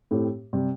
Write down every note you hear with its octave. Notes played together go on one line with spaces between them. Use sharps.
A2 A3 C4 G4
C3 G3